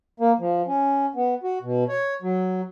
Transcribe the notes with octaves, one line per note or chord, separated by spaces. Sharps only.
A#3
F3
C#4
B3
F#4
B2
C#5
F#3